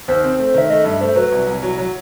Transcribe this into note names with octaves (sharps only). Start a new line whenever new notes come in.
D#2 C5
C4
A3
D#3 E5
A3 D#5
G2 E5
A3 C5
F#3 B4
C2
C2
F#3
F#3